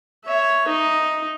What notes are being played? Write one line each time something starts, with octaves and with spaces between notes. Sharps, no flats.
C#5 E5
D#4